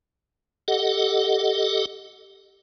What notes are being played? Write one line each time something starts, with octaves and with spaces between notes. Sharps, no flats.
G4 A4 D#5 F#5